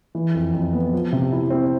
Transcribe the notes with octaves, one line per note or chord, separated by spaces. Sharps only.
E3
F2
F2
B3
F3
C3
E4
C4